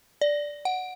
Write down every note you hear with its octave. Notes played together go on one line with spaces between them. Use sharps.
D5
F#5